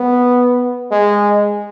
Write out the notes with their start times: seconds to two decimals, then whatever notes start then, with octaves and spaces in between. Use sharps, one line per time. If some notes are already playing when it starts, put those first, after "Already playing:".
Already playing: B3
0.91 G#3